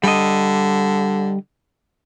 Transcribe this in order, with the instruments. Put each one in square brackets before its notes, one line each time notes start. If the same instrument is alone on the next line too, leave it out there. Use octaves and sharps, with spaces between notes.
[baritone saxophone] D3 [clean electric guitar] G3 D#5